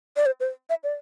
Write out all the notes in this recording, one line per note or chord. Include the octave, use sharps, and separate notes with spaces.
D5
C5
C5
E5
D5